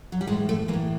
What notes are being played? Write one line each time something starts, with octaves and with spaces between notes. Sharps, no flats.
F#3
G3
A2 E3 G#3
A3
E3 A#3
A2